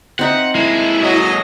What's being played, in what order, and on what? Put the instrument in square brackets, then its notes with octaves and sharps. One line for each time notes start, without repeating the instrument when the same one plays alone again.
[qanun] C4 D#4 E5 [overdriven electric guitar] F#5
[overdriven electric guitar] G#3 A#3 [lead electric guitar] E4
[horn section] F#3 D#5